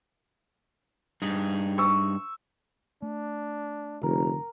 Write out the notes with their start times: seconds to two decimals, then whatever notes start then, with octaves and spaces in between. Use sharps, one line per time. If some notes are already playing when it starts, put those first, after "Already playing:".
1.22 G2 D#4 G#4
1.78 C#6 E6
3.02 A3 D4
4.03 F1 D3 A#4